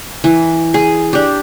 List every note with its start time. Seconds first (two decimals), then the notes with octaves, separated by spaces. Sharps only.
0.24 E3
0.74 G#4
1.13 D4 G4